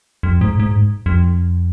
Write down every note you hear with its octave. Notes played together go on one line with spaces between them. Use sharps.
F2
G#2
G#2
F2